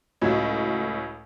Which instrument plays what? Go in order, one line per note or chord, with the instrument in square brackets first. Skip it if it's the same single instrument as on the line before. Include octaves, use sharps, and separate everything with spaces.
[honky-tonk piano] C#2 A2 F#3